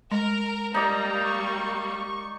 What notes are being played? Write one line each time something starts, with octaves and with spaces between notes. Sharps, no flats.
G#3 A#4
G3 A#3 D#4 D5 A#5
C#6